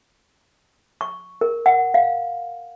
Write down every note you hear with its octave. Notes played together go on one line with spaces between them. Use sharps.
C#6
A#4
F#5
F5